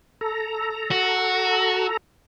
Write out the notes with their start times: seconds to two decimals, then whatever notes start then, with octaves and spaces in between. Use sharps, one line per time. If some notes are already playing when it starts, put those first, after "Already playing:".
0.21 A4 A#5
0.91 F#4